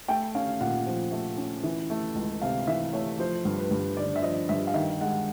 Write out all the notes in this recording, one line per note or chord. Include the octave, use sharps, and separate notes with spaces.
A3 G5
C#4 F5
A#2 F#5
F3
A3
C#4
E3
A3
C#2
C3 F5
E3 E5
A3 C#5
F3 C5
G2
B4
G2
D3 D5
E5
F3 D#5
G2 E5
F5
D#3 E5
G#3 F#5